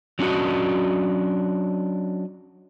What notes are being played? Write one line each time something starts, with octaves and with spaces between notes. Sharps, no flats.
F#3 C#4 D4 F#4 D#5